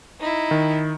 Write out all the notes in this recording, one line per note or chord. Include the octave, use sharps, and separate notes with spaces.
D#4 E4
D#3